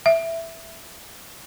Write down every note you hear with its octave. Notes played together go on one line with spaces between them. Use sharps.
E5